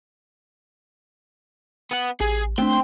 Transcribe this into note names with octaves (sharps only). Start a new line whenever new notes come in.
B3 F#5
A1 G#4
A3 C4 D4 C6